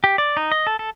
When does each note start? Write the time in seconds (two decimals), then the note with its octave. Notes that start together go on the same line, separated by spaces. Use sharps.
0.04 G4
0.18 D5
0.37 D#4
0.52 D#5
0.67 A4
0.79 A4